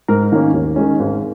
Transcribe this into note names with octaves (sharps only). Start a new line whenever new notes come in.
G#2 A#4
D#3 A#3 C#4
D#2
D#3 G#3 C#4
G#1